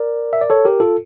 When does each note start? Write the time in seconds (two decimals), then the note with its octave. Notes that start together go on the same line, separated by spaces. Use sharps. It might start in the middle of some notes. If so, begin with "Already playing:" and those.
Already playing: A#4 D5
0.33 E5
0.41 D5
0.50 A4 C#5
0.65 G4 A#4
0.80 F4 A4